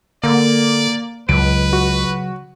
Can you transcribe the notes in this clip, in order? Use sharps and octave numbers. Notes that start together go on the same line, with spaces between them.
D3 A#3 D5
C#2 C#3 F#3 B4 D7
F#4